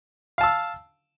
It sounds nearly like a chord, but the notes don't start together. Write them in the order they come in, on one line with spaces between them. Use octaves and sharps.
F5 A5 E6